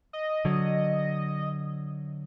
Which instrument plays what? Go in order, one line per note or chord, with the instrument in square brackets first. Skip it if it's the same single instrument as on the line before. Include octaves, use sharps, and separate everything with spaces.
[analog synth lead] D#5
[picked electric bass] D3 F#3